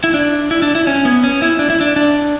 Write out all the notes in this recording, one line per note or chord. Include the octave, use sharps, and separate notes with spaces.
E4
D4
E4
D4
E4
C#4
B3
C#4
E4
D4
E4
D4
D4